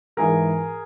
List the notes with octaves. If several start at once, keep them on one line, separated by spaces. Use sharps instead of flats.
G#2 E3 G#4 A#4